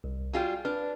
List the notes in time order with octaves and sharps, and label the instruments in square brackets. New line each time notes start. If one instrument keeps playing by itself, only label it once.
[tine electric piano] C2
[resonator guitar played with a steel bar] G3 F4 G#4 [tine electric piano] F#4 G5
[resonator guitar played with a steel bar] D4 [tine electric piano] B4 F6